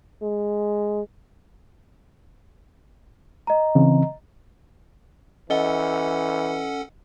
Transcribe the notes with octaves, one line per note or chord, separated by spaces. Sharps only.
G#3
D#5 A#5
C#3 E3 C4
E3 C#4 A4 D#5 F#5 G7